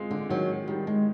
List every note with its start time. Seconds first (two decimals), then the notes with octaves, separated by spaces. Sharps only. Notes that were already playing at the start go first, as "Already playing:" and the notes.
Already playing: G#3 C4 F4
0.11 D3
0.29 D#3 F#3
0.68 D#3 G3
0.87 G#3